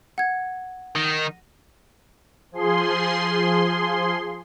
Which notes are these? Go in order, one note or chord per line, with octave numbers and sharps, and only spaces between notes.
F#5 G#6
D#3 A#6
F3 G#4 C6